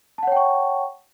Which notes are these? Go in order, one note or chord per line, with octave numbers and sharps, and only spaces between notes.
C#5 F#5 G5 A5 C#6